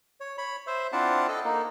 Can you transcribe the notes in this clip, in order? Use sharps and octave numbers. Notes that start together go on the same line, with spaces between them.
C#5
C#5 B5
C5 E5
C4 D4 E4 F4 F#5 A5
A4 D#5
A#3 D#4